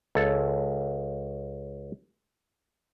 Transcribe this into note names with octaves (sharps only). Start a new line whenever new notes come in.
C#2 A4 C#5